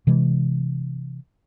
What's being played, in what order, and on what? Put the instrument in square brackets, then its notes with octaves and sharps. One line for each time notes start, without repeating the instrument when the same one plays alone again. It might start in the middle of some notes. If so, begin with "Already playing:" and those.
[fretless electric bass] C3 E3 G#3